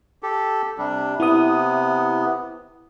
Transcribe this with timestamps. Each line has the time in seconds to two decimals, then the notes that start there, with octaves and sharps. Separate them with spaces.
0.23 G4 A4
0.78 C3 G3 D4
1.20 C3 B3 E4 D#6